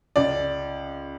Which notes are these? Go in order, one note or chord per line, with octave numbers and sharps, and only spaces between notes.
C#2 D5